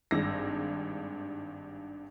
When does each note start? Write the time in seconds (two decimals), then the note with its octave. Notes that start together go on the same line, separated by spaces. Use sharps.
0.11 G#1 G2 G#3 E6 A#6